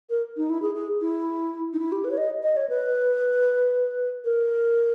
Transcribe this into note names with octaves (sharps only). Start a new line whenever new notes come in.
A#4
D#4
E4
G#4
G#4
E4
D#4
E4
G4
B4
C#5
D#5
D#5
C#5
B4
A#4